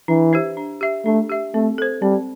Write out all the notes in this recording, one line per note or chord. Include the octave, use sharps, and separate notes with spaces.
E3 D4
G4 C5 E5
D4
G4 E5
A3 D4
G4 E5
A3 C4
A4 C5
G3 C4